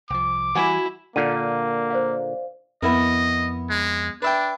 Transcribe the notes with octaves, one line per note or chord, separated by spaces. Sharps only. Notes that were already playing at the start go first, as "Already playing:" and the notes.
C2 F3 D6
E3 G3 E4 F#4 G#5
A#2 D3 A#3 D4 G6 D#7
C5 D5 F5
F2 B3 E4 A#4 D#5
G#3
D4 B4 E5 G5